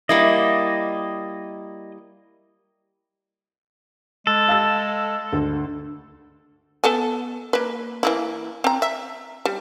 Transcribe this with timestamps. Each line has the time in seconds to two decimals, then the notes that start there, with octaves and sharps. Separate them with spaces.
0.09 G3 A#3 E4 D#5
4.27 G#3 A4
4.48 F5 E6 A6
5.33 D2
6.84 B3 A4 G#5
7.53 A#3 B4
8.03 E3 A#3 E4
8.64 C4 A#5
8.82 E5
9.45 G3